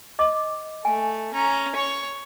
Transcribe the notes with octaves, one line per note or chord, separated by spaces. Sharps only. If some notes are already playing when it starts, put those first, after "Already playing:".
D#5 D6
A3 G#5
C#4 A#5
C#5 C#6